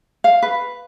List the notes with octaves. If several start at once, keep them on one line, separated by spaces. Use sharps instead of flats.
F5
B4